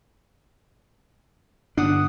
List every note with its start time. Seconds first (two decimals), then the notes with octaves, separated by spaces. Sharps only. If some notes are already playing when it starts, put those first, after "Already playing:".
1.78 G1 D4 F#5 D#6